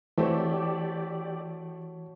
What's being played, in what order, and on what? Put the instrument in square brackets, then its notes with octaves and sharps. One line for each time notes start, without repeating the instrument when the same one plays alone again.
[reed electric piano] E3 [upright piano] A3 C4 [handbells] F#4 C#5 A5 [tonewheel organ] G4 D5